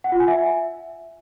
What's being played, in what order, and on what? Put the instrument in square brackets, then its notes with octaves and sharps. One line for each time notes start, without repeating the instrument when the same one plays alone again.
[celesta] F#5
F4
G#5
E5